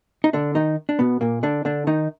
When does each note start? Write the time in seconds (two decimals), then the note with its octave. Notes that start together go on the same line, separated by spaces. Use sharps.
0.24 D#4
0.33 D3 D4
0.55 D#3 D#4
0.89 D4
0.99 B2 B3
1.21 A#2 A#3
1.43 D3 D4
1.65 D3 D4
1.87 D#3 D#4